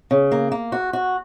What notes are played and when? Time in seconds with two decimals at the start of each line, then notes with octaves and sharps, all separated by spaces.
0.11 C#3
0.32 A#3
0.52 A#3
0.72 F#4
0.93 F#4